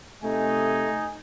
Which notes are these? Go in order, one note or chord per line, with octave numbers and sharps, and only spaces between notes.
C3 A3 D#4 D#5 G#5